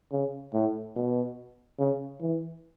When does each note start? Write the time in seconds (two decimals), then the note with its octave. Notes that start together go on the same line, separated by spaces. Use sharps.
0.12 C#3
0.53 A2
0.96 B2
1.79 C#3
2.21 E3